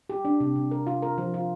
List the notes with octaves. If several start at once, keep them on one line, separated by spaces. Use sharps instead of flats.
G4
D4
C3
C3
A#4
F4
A#4
F3
F4